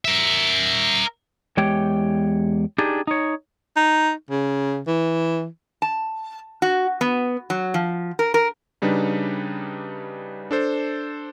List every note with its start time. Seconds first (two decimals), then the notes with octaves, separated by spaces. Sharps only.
0.05 A#4 E5
1.57 E2 G#3 G4 C#5 G5
2.78 D4 D#4 G4 G#4
3.07 D#4 C#5
3.77 D#4
4.31 C#3
4.87 E3
5.82 A5
6.62 F#4
7.01 B3
7.50 F#3
7.74 F3
8.19 A#4
8.34 A#4
8.82 C#3 G3 D4 D#4 B4
10.51 D4 A4 C5